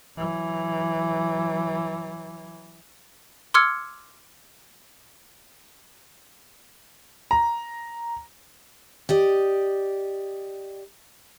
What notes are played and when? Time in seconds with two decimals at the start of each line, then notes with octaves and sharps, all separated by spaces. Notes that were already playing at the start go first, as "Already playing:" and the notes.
0.17 E3 F#3
3.54 C6 D6 E6 F6 G#6 C#7
7.31 A#5
9.09 G4 D5 D#5